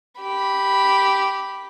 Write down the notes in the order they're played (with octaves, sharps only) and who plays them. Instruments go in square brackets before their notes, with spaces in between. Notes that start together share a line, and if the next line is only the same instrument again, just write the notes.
[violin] G4 B5